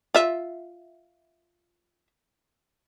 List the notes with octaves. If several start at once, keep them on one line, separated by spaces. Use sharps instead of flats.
F4 E5